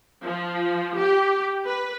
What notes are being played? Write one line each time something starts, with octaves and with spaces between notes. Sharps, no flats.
F3
G4
B4